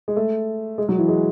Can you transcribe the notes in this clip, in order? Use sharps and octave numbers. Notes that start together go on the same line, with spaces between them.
G#3
A3
G#3
F#3
E3
G#3